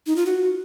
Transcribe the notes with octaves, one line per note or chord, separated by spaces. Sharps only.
D#4
F4
F#4